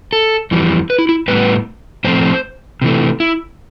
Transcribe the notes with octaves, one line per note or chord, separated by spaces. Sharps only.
A4
F2 E3 G3
B4
E4
E4
A2 G3 B3 B4
A2 F3 A3 C4 C5
C3 E3 A3
E4